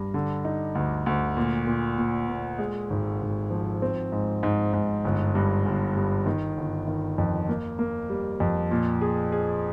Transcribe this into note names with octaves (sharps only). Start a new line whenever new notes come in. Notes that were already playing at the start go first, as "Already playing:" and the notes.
Already playing: G2
D3
D#4
D2
D2
A#2
A#2
A#2
A#2
G#3
G#1
G#1
F3
C4
G#2
G#2
G#2
G1
G2
G1
G2
D#3
G1
D#3
F2
A#3
A#3
G3
F2
A#2
G#4
G#4